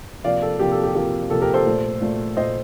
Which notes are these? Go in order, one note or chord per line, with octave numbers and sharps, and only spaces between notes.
C3 F3 A#3 D5 F5
A4
C3 F3 A#3 G4
A4
G4
C3 F3 A#3 G4
C3 F3 A#3 A4
G4 A#4
A4 C5
A#2 A3
A#2 A3
A#2 A3 C5 D#5